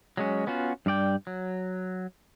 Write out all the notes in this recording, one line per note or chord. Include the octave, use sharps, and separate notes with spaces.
F#3 G#3 C#4
B3 C#4 F4 F#4
G2 G3 D5 G5
F#3